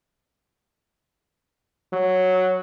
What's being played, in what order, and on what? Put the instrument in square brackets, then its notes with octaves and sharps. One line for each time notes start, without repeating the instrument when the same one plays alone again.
[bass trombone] F#3